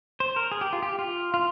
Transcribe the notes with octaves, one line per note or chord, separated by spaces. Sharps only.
C5
A#4
G#4
G4
F4
G4
F4
F4